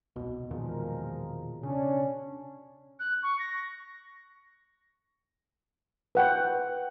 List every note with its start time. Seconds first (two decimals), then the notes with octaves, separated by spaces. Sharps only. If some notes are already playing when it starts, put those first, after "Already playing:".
0.16 D#1 C2 B2
0.51 E2 A#2 D#3 F3 G#3 A#4
1.63 C#3 C#4 D4
3.00 F#6
3.23 C#6
3.39 A#6
6.15 B4 F#5 G5